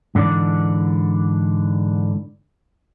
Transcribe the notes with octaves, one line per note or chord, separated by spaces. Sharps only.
G#2 D3 E3 D4 D5